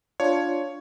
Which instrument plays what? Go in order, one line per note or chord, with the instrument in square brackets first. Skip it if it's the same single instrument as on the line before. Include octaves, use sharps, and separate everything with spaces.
[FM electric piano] D4 F4 [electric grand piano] C#5